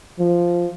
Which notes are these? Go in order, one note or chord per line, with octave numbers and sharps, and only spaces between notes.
F3